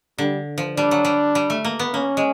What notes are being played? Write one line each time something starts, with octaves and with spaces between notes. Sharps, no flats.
D3 G3
F3
G3 D4
F#3
G3
G3
A3
A#3
B3
A#3 C#4
G#3